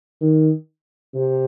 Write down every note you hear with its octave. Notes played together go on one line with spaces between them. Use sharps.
D#3
C3